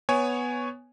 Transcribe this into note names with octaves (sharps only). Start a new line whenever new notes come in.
B3 C#5 G#5